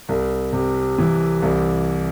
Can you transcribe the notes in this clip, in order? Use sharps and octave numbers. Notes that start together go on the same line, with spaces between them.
C2
C3
E3
C2